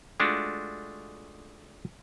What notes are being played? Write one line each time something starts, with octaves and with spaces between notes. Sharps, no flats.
G#3 A3 D4 F4 F#4